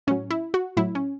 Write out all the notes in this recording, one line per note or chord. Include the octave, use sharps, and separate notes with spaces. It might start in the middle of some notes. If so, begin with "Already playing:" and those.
A2 F#3 C#4
E4
F#4
A2 F#3 E4
C#4